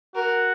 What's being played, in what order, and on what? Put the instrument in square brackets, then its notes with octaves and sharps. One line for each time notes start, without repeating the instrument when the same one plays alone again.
[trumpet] F#4 [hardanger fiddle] A#4